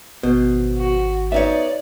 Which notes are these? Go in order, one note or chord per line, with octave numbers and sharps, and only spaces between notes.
G#1 B2 C5
F#4
B3 D#4 C#5 D5 E5